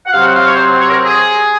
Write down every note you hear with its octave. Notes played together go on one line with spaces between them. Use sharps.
F#5
C3 F#3 C4 F5
F#5
F5
C#5
C5
C#5
A#4
G#4